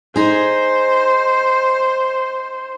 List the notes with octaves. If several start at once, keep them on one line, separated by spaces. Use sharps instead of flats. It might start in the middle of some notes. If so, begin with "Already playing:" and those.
D#4 G#4 C5